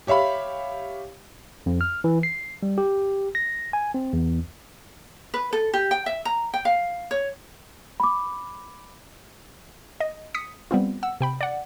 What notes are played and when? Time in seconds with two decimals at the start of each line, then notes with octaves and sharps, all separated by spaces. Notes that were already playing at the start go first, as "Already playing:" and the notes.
0.07 G4 C#5 E5 F5 B5
1.66 F2
1.81 F6
2.04 E3
2.23 C7
2.63 G3
2.78 G4
3.35 A#6
3.73 G#5
3.94 C4
4.13 E2
5.34 B4
5.53 A4
5.74 G4
5.91 G5
6.06 E5
6.25 A#5
6.54 G5
6.65 F5
7.11 C#5
8.00 B5 D6
10.00 D#5
10.34 D#6 B6 C#7
10.71 G3 B3 C4 F4
11.03 F#5 E6
11.20 C3 G5 B5
11.41 D5 F#5